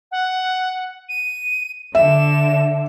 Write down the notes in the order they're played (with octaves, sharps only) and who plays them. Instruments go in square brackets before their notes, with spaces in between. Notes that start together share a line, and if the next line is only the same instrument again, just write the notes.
[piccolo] F#5
D#7
[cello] D3 [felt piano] E5 [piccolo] E7